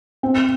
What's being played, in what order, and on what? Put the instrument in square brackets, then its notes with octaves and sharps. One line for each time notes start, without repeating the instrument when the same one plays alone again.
[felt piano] C4